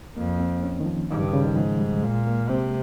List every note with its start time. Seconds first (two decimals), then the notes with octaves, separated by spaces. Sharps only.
0.17 F2 A#3
0.40 C4
0.63 C#4
0.80 D#3
0.86 F3
1.10 G2 D#3
1.21 C#3
1.33 C#3
1.45 D#3
1.56 G#2 F3
1.79 G3
2.03 A#2 G#3
2.27 A#3
2.49 C3 C4